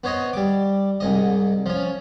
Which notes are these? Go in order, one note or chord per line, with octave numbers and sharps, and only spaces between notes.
B3 C5 C#5 D#5
G3 D6
C2 G#2 D#5
F3 C#4